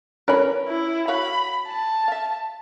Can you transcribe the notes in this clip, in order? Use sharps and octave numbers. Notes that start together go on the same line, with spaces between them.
C#4 A#4 B4 C#5 B5
E4
F#4 C#5 F5 B5
A5
E5 F5